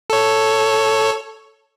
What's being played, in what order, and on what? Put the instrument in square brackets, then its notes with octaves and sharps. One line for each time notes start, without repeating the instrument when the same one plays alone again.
[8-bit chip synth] A4 C#5